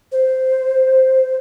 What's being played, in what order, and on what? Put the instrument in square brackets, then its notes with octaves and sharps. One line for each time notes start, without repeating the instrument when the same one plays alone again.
[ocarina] C5